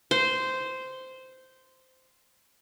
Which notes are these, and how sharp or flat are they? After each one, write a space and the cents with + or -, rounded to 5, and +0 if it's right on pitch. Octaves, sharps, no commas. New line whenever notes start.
C5 -10